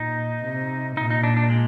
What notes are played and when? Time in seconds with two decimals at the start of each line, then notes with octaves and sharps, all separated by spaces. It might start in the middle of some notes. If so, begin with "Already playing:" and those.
Already playing: A#2 D#4
0.44 C3
0.97 A#2 D#4
1.10 D#4
1.23 D4
1.37 D4
1.50 G#3